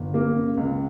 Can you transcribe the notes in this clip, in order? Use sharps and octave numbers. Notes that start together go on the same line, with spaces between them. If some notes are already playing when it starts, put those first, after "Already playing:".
Already playing: G1
A#3
C#3
C#2